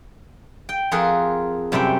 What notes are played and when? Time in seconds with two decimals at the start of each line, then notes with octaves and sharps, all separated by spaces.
0.69 G5
0.91 F2 F4 G#4 A#4 F#5
1.72 F#2 C3 G3 E5 G5